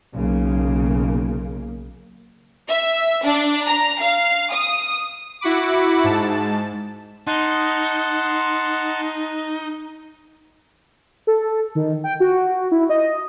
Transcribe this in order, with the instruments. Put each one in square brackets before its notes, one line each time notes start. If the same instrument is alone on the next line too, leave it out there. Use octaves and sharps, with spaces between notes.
[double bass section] B1 C#3 A#3
[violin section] E5
D4
A#5
F5
D#6
[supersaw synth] E4 F#4 F#5 B5 D6
G#2 A5
[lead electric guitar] D#4 [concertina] F#5 A5 C6
[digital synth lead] A4
D#3
G5
F#4
E4
D#5